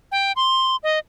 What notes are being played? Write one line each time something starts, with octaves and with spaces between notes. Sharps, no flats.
G5
C6
D#5